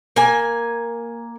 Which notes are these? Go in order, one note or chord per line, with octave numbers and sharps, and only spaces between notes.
A#3 G#5